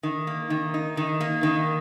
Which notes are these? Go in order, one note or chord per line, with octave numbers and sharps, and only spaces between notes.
D#3
A#3
D#3
D#4
D#3
A#3
D#3